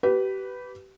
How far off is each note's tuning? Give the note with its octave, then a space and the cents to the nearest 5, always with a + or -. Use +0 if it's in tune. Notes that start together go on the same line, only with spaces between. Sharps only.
G4 -30 B4 +0